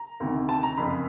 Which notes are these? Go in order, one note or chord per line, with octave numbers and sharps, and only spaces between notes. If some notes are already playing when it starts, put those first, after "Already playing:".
Already playing: A#5
D2 C3 D#3
A5
A#5
F#1 F2 C#3 B5